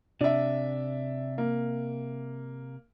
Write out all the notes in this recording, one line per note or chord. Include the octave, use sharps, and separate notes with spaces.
C3 D4 E5
A#3